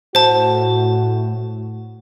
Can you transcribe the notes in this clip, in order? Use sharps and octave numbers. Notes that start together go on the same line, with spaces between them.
A2 F#4 C5 A5